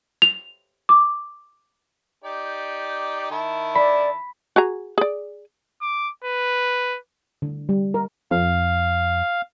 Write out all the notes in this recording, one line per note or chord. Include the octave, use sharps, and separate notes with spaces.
F7
D6
D#4 G4 D5
D#3 E4 A5
D5 B5
F#4 G#4 A#5
G#4 D5
D6
B4
D3
G3
A#4
F2 F5